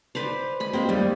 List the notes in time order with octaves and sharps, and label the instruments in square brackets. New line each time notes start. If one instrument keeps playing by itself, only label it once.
[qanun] B4 C5 D5
D#5 B5
[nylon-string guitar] G#3 A#3 G4 [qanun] C4
[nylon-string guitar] D#2 D#3 G3 [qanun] A#3